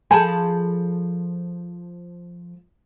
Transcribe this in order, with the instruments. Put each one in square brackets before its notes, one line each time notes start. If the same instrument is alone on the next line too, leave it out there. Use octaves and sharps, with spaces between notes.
[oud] F3 G#4 A4 [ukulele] G#5 A5 B5